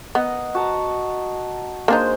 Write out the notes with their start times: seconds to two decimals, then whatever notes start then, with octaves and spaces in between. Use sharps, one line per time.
0.15 B3 A#4 D#5 F#5
0.55 F#4 A5 A#5
1.88 G#3 A#3 D4 D#4 C5